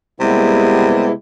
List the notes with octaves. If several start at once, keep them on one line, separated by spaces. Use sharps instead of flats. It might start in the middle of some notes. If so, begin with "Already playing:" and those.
C3 G3 G#3 A#3 B3 E4